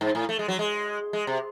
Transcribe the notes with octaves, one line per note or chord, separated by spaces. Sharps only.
G#2
A2
A3
G#3
F#3
G#3
G#3
C3